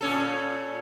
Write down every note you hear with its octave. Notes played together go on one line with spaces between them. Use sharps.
A#2 C#4 A4